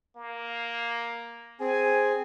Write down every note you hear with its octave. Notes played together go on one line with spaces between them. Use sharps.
A#3
C4 G#4 G#5